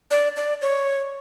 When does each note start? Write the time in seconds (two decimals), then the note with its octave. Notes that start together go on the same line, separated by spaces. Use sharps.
0.11 D5
0.36 D5
0.62 C#5